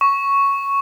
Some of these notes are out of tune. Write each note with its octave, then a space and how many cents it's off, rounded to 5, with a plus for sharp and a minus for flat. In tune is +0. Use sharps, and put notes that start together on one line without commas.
C#6 +0